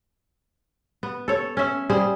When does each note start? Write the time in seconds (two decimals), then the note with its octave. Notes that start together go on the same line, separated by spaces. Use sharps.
1.03 B3
1.28 A4 C#5
1.57 C#4 E5
1.90 G3 G#4 C5